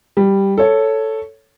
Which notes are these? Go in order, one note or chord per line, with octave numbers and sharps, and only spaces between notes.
G3
A4 C#5